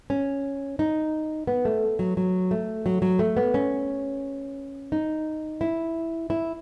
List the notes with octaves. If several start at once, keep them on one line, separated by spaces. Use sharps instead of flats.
C#4
D#4
B3
A3
F#3
F#3
A3
F#3
F#3
A3
B3
C#4
D#4
E4
E4